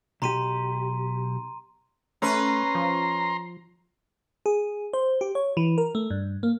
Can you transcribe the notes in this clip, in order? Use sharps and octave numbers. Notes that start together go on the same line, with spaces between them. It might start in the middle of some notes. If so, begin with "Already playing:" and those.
B1 G4 A#5 C6 D#7
A3 C#4 B4 A#5 C6
F3
G#4
C5
G4
C#5
E3
A#4
A3
G2
A#3